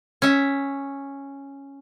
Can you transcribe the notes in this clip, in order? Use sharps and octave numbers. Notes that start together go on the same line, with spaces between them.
C#4 E5